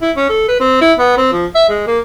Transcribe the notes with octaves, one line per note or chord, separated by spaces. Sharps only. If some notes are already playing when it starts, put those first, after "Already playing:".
E4
C#4
A4
B4
C4
E4
B3
C4
F3
E5
G#3
A#3